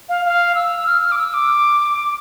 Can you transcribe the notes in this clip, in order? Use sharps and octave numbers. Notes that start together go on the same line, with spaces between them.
F5
F5
E6
F6
F6
D6
E6
D6